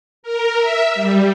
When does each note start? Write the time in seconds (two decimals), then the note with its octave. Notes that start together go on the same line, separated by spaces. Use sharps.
0.23 A#4
0.59 E5
0.95 G3